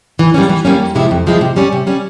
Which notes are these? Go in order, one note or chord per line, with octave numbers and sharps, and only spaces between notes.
E3
G3 A#3 C#4
E3
G3 A#3 C#4
F2
C3 F3 G#3 E4
F2
C3 F3 G#3 E4
C3
G3 C#4
C3
G3 C#4